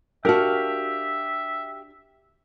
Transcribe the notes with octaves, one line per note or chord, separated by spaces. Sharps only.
D4 F#4 G4 A#4 E5 F5 A5